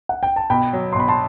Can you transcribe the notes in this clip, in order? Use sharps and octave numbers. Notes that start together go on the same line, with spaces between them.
F#5
G5
A5
B2 G5 B5
F#3
C6
B2 B5
A5 C6